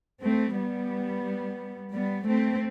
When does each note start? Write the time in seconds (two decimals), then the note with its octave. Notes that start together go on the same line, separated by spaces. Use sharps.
0.22 A3 C4
0.55 G3 B3
1.93 G3 B3
2.26 A3 C4